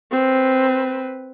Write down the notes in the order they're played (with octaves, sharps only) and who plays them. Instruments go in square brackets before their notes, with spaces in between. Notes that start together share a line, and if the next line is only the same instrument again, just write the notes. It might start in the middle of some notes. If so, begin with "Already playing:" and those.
[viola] C4 B4